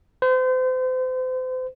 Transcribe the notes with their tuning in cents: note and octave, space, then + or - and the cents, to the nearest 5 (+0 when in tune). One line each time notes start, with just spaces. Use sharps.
C5 -35